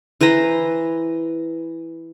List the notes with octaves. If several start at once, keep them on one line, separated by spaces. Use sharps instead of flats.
E3 B4 C5 A#5